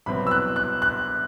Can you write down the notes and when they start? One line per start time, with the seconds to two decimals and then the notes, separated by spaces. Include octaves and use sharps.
0.06 C2 B2 F#3 C4 B5
0.27 E6
0.31 F#6
0.56 F#6
0.82 F#6